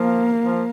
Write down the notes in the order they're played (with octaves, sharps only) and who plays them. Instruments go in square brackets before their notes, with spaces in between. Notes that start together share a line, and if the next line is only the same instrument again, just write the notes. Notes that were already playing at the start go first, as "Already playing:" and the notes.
Already playing: [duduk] F3 [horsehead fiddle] A#3
[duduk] F3